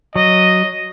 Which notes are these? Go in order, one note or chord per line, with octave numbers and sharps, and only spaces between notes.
F#3 D#5